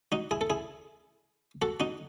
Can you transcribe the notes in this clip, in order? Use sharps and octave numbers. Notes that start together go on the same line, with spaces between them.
D#4 F#4
E4 G#4
A4
E4 G#4
F#4 A4
D#4 F#4